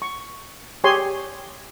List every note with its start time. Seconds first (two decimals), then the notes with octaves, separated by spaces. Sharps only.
0.02 C#6
0.84 G4 G#4 C#5 G#5 C6